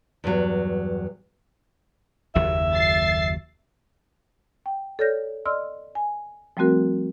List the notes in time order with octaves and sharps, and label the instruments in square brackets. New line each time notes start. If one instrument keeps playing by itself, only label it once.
[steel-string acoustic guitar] E2 G2 F#3
[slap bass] F#1 D#2 F#3 [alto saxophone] E5
[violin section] A6 C7
[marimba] G5
A4 C#5 D5 F6 G6 A#6
D5 D#5 C6 E6 F6
G#5
F3 G3 A3 C4 F#4 A#4